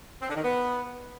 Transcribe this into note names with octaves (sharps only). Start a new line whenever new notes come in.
C4
D3
D#3
B3